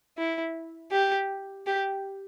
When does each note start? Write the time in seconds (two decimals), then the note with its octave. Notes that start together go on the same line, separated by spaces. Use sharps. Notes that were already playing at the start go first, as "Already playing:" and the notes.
0.18 E4
0.91 G4
1.67 G4